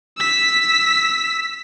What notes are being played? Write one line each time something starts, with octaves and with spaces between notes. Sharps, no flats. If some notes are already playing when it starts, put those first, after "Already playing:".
E6 B6